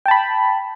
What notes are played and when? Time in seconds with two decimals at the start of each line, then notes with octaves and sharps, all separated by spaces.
0.06 G5
0.08 A5
0.11 B5